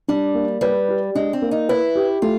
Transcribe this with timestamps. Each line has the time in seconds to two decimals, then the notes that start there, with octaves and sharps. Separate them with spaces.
0.08 G3 D4
0.35 A#3
0.61 G3 B4
0.89 G4
1.15 G#3 D4
1.33 C4
1.42 A#3
1.51 D#4
1.69 E4 B4
1.96 G4
2.22 A3 F4